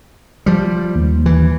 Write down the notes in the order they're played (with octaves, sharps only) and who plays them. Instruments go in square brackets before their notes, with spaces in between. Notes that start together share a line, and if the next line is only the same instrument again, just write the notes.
[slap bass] F3 G3
[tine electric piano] D#2
[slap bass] E3